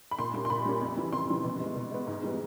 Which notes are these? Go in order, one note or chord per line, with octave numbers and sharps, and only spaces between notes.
B5
A#2 C6
G3 A#3 C#4 C6
C6
A#2 B5
G3 A#3 C#4
F2
C#3 E3 G3
F2 C6
C#3 E3 G3
B2
G#3 B3
B2
G#3 B3
G#2
E3 G3 B3